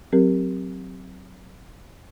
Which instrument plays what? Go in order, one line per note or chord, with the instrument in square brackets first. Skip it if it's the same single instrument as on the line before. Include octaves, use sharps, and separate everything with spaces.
[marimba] F#3 C4 G4 A#4